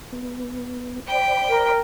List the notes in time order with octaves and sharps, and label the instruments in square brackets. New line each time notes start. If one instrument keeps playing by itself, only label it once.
[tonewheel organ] B3
[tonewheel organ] C5 D5 B5 [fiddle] G5
[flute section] A#4